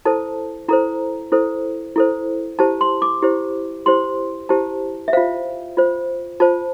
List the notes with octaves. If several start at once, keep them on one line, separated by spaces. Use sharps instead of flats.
E4 A4 C5 A5
E4 A4 C5 A#5
E4 A4 C5
E4 A4 C5
E4 G4 C5 A5
C6
D6
E4 G4 C5
E4 G4 C5 C6
E4 G4 C5 A5
E5
F4 C5 F5
F4 C5
F4 C5 A5